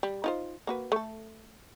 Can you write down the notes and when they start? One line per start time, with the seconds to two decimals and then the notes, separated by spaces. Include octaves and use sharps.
0.03 G3
0.24 D#4 F4 C5
0.67 A#3 F#4 B4
0.92 A3 A4